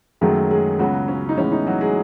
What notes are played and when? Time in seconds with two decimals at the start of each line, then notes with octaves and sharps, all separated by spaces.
0.21 F#2 D#3 F#3 G#3 A3 G#4
0.51 G#3 G#4
0.79 C#2 C#3 F#3 B3 F#4
1.08 C#4
1.29 D#4
1.37 A2 E3 G#3 B3 C#4
1.52 D#4
1.67 F#3 F#4
1.81 G#3 G#4